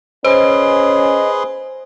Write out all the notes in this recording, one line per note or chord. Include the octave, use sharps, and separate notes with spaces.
C#4 G#4 B4 C5 D#5 C6